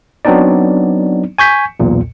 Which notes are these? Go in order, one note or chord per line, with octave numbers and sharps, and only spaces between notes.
F#3 B3 C4 D4 D#4 D5
G#5 C#6 G6 B6
B1 E2 A#2